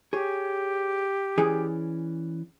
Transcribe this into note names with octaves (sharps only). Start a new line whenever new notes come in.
G4 G#4 C#5
E3 C#4 G#4 D5